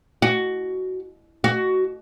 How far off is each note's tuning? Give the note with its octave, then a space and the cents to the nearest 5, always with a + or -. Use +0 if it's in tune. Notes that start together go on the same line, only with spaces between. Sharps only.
F#4 +10
F#4 +15